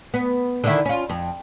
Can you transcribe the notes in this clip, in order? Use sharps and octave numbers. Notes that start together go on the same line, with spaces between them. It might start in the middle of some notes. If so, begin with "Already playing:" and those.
B3
D3 D#3 E4
C#4 F4
F2